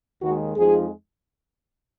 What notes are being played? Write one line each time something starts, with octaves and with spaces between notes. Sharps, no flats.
D#2 D#3 G#3 F#4
F2 F3 G#3 D#4 G#4